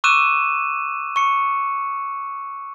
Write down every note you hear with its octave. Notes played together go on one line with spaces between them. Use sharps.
C#6 D6 E6 F#6 D#7 E7
C#6 C#7